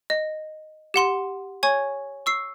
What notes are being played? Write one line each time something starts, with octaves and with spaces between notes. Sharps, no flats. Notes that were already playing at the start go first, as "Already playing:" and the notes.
D#5
G4 F#5 C6 G7
C#5 G#5 C#6 G#6
C#6 E6 C7